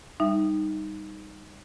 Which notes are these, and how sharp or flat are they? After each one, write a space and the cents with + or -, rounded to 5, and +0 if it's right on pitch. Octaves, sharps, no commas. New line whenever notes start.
G3 +15 D#4 -5 E5 +10